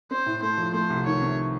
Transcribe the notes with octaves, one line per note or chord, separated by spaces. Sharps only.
C4 C5
A2
A3 C5
F3
A3 C5
C2
D#3 C#5
C3